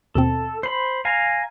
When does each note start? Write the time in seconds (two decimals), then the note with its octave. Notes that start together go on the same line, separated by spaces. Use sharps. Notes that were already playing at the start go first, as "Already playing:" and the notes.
0.15 D#2 B2 C4 A4
0.63 C5 B5 C7
1.05 F5 G#5 A#5